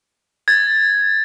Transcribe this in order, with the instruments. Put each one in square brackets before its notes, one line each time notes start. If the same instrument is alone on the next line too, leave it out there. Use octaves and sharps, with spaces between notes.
[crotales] G#6 A6